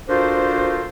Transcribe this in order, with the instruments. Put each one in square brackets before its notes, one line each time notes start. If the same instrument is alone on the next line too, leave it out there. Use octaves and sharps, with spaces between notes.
[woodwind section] D4 F4 F#4 A4 A#4 C5